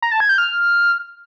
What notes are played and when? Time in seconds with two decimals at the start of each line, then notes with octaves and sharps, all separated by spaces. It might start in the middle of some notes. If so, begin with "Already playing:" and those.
0.02 A#5
0.11 A5
0.20 G#6
0.29 G6
0.38 F6